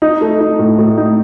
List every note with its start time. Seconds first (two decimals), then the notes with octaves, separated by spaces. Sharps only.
0.02 D#4
0.21 A3
0.40 D#4
0.59 A2
0.78 A2
0.97 D#4